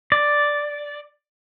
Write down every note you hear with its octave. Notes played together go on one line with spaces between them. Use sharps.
D5